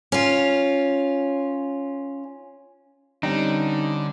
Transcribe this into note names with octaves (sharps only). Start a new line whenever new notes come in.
C#4 F4
D3 G3 C4 C#4 D#4